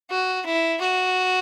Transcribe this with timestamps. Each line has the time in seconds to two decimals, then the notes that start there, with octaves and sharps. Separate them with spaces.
0.10 F#4
0.46 E4
0.81 F#4